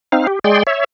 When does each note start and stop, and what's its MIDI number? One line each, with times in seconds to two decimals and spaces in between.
0.12 0.27 60
0.12 0.27 63
0.12 0.27 77
0.27 0.39 67
0.44 0.63 56
0.44 0.63 68
0.44 0.63 74
0.44 0.63 79
0.44 0.63 84
0.67 0.84 73
0.67 0.84 76